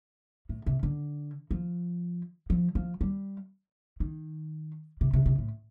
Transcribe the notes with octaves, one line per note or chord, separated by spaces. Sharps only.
A2
C3
D3
F3
F3
F3
G3
D#3
C3
C3
C3
A2